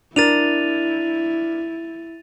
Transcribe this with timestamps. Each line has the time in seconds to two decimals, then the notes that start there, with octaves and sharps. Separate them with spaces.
0.16 D4 E4 A#4 A6 D#7 F7